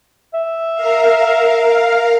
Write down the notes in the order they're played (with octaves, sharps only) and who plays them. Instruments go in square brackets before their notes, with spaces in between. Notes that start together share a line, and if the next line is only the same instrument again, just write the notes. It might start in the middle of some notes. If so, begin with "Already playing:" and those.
[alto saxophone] E5
[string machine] A#4 F5